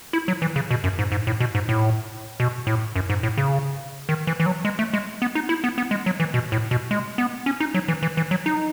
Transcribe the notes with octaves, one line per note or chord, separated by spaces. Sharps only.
E4
F#3
E3
C#3
B2
F#2
G#2
G#2
A2
B2
G#2
A2
B2
A2
F#2
G#2
A2
C#3
D#3
E3
E3
F#3
G#3
A3
G#3
B3
D#4
E4
B3
B3
G#3
F#3
E3
B2
A2
B2
G#3
B3
C#4
D#4
F#3
E3
E3
E3
F#3
D#4